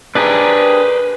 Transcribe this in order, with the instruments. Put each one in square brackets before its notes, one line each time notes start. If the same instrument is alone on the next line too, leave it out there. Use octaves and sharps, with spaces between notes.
[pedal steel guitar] D4 G4 G#4 [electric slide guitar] B4 C5 A#5